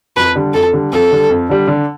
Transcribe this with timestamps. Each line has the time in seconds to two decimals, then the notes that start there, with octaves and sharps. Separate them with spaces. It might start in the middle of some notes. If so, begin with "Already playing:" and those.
0.16 F2 B4
0.35 D3 G3
0.54 F2 A4
0.73 D3 G3
0.92 F2 A4
1.12 D3 G3
1.30 F2
1.49 D3 G3
1.68 D3